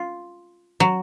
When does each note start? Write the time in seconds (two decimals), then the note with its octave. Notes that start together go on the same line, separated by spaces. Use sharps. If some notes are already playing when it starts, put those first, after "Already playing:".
Already playing: F4
0.80 F#3